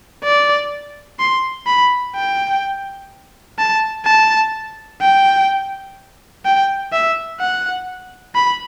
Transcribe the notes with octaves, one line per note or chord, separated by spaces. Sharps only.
D5
C6
B5
G5
A5
A5
G5
G5
E5
F#5
B5